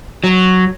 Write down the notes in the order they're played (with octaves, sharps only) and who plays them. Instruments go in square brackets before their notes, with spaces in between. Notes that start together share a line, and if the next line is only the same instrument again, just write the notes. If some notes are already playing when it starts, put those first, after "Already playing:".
[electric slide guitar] F#3